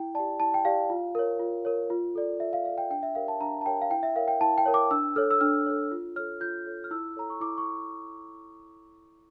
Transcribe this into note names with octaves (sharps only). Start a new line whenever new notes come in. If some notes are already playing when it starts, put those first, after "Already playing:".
Already playing: E4 G5
G4 D5 A5
E4 A5
G5
G4 D5 F5
F4
A#4 C#5
F4
A#4 C#5
F4
A4 D5
F4 E5
F5
A4 D5 F5
G5
D4 G5
E5
G4 A#4 C#5 F5
A5
D4 A#5
A5
G4 A#4 C#5 G5
F5
E4 G5
E5
A#4 C#5 F5
G5
E4 A5
G5
A#4 C#5
D6
D4 E6
A4 C#5 F6
E6
D4 F6
A4 C#5
F4
A4 C#5 F6
F4 G6
A4 C#5
F6
E4 E6
A4 C#5 A#5
C#6
E4 D6
C#6